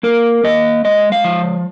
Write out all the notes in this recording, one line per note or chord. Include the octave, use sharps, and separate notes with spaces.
A#3 A#4
A#3 D#5
G#3 D#5
F5
F3